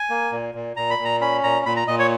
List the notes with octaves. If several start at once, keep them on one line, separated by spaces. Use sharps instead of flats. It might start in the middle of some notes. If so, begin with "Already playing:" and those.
Already playing: G#5
A#3
A#2
A#2
A#2 A#5
B5
A#2
A#5
C#4 B5
A#2 A#5
A#2 B5
A#5
A#2 D#5
C#5